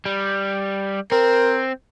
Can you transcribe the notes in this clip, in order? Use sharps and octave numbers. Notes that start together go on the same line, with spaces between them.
G3
C4 A#4